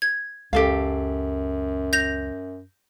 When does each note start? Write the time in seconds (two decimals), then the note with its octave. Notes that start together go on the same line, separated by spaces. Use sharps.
0.02 G#6
0.53 C#2 F#2 G4 A4 F5
1.93 G6 A#6 F7